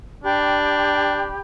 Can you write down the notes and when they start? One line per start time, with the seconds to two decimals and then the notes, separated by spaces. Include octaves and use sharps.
0.24 D4 G4 G5 B5